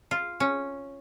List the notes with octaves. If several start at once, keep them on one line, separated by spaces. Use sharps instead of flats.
F4
C#4